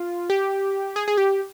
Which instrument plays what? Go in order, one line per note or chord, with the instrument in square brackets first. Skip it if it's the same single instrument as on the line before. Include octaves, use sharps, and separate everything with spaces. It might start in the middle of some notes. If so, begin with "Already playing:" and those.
Already playing: [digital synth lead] F4
G4
G#4
G#4
G4